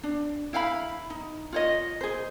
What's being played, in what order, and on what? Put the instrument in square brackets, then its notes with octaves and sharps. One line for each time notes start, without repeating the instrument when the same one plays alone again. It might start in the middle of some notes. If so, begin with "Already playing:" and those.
[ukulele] D4
E4 F5 F#5 B5
D#4
F4 C#5 D#5
G#4 C5